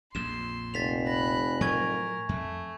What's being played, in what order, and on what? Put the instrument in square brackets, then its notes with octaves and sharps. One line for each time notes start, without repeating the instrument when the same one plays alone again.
[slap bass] A#1 F2 [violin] C6 [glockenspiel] E7
[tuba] F1 [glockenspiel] A6 B6 F7
[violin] B5 F#6 [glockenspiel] A#6
[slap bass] A2 F3 F#3 [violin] A#4 [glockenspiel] G#5 C#6 G#6
[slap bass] F2 [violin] A3